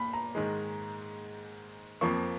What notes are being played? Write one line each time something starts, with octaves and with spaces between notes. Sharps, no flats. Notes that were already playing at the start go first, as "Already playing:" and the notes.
Already playing: A#2 B5
A#5
G#2 D#3 G#3
F2 F3 A#3 C#6